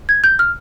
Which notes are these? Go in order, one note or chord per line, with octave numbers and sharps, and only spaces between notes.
G#6
G6
F6